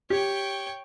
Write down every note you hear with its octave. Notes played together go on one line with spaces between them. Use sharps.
G4 C#5 G5